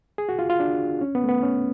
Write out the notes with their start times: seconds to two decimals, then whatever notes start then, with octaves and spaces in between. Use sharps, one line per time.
0.18 G#4
0.29 F#4
0.39 F4
0.50 F4
0.60 D4
1.01 C#4
1.15 B3
1.24 A3
1.29 B3
1.43 C#4